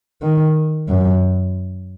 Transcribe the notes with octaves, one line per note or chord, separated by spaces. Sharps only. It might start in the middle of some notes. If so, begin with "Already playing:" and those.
D#3
F#2